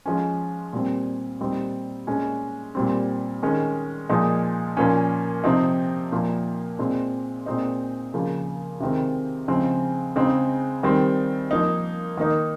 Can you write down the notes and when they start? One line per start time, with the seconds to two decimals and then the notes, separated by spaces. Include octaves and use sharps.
0.06 F3 G#3 C#4
0.73 A#2 G3 C4
1.40 A#2 G3 C4 D#4
2.07 A#2 G#3 C#4
2.75 A#2 G3 C4
3.43 D#3 G#3 C#4
4.09 A#2 F3 G#3 D#4
4.77 A#2 F3 A#3 C#4
5.44 C3 F3 C4 D#4
6.12 A#2 F3 A#3
6.79 A#2 G#3 C4
7.46 A#2 G#3 C4 D#4
8.14 C#3 F3 A#3
8.80 C3 D#3 G#3 C4
9.48 C#3 F3 G#3 C4
10.16 C#3 G#3 C4 D#4
10.83 D#3 G3 C4
11.51 F3 A#3 D#4
12.17 D#3 A#3 D#4